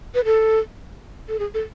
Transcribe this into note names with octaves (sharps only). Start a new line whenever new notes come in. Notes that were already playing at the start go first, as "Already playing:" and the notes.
B4
A4
A4
G#4
A4